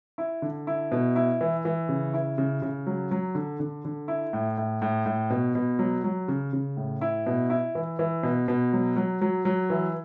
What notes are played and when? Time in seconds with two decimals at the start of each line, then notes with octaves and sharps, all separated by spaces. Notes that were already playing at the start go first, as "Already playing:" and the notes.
0.18 E4
0.42 D3
0.67 E4
0.92 B2
1.16 E4
1.41 E3
1.65 E3
1.89 C#3
2.14 E4
2.38 C#3
2.62 C#3
2.87 F#3
3.11 F#3
3.35 D3
3.60 D3
3.85 D3
4.08 E4
4.33 A2
4.58 A2
4.82 A2
5.06 A2
5.30 B2
5.55 B2
5.79 F#3
6.04 F#3
6.28 C#3
6.53 C#3
6.77 A2
7.01 E4
7.26 B2
7.50 E4
7.75 E3
7.99 E3
8.23 B2
8.48 B2
8.73 F#3
8.96 F#3
9.21 F#3
9.45 F#3
9.70 E3